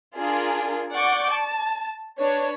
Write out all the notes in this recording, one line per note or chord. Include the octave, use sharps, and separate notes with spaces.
D4 F4 G#4 A#4
D5 F#5 C#6 D6 G6
A5
D4 B4 C#5